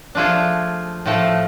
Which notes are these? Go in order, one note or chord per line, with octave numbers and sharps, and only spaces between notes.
F3 A3 D4 F4 G#4
A2 F3 A3